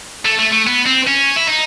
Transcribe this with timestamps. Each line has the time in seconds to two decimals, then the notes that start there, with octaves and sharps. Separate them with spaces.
0.25 A3
0.39 A3
0.52 A3
0.67 B3
0.86 C4
1.07 C#4
1.36 E4
1.47 D#4